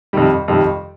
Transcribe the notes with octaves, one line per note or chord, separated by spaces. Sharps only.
F2 C3 D#3 G3
F2 C3 D#3 G3